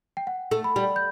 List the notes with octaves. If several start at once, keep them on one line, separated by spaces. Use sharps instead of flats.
G5
F#5
A3
B5
G3
G6